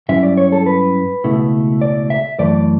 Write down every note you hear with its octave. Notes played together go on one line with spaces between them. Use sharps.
G2 F#3 C#4 E4 E5
D5
C#5
A4
B4
C#2 B2 A3 E4
D5
E5
F#2 E3 A3 D5